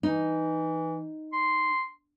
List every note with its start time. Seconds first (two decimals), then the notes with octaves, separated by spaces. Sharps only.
0.03 E3 D#4
1.33 C6